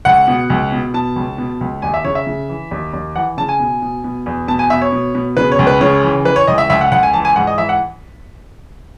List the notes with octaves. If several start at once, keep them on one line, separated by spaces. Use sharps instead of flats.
C#2 F#5
B2
C#2
B2
B2 A5
C#2
B2
C#2
D#2 G#5
E5
C#3 C#5
E5
C#3
E3
D#2
D#2
E3 F#5
C#3 A5
G#5
B2
B2
B2
E2
B2 A5
G#5
B2 E5
C#5
B2
B2
C#3 B4
C#5
C#2
B4
C#3 C#5
E3
E3 B4
C#5
C#2 D#5
E5
C#2 E5
F#5
C#2 F#5
G#5
E3 A5
G#5
G#2 F#5
D#5
E3 E5
F#5